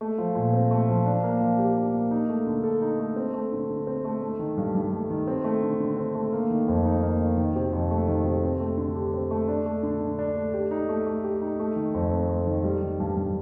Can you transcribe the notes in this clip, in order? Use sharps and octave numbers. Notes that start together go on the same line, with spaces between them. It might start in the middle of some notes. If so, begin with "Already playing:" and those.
A3
F3
A#2
C4
A3
F3
D4
A#3
F3
G4
D4
A#3
D#4
A3
D3
A4
D#4
A3
C4
A3
D3
D3
C4
A3
A3
D#3
G2
G2
A3
D#3
C4
A3
D3
D3
C4
A3
A#3
D#3
F2
D#4
A#3
D#3
D#3
C3
F2
A3
D#3
C3
C4
A3
D3
G4
C4
A3
D4
A3
D3
D3
D4
A3
G4
D#4
A3
A3
G4
D#4
A3
D#3
F2
C4
A3
D#3
G3
D#3
G2
G2